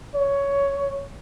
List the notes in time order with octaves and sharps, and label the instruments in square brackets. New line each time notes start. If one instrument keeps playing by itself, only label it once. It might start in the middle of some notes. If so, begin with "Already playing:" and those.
[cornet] C#5